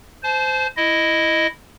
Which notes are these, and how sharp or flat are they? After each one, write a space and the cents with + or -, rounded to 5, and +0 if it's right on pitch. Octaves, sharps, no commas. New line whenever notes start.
C5 -15 A5 -40
E4 +0 D#5 +0